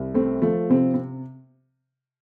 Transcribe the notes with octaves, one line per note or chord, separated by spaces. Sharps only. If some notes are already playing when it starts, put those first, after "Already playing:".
Already playing: C2
A3 C4
F3 A3
C3 C4
C4